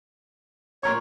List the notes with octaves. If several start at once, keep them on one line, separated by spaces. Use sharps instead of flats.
A#2 A#4 C#5 C#6